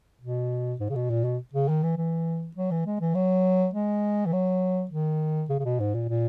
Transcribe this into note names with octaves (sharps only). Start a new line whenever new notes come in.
B2
G#2
C#3
B2
A#2
B2
C#3
D#3
E3
E3
F#3
E3
G#3
E3
F#3
G#3
E3
F#3
D#3
C#3
C#3
B2
G#2
A#2
A#2